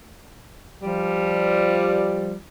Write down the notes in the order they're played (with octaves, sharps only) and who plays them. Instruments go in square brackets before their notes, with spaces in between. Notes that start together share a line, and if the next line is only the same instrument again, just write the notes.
[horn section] F3 G3